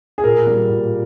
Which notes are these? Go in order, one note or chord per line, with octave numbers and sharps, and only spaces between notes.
G#4
A#2 A#4
G3
A#2